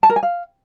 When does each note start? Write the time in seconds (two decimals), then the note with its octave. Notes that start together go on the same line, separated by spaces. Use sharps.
0.03 A5
0.10 A#4
0.16 G#5
0.23 F5